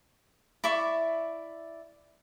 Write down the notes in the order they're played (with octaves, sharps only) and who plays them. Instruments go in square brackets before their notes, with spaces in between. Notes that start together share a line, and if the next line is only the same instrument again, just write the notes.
[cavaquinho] E4 D5 E5 C#6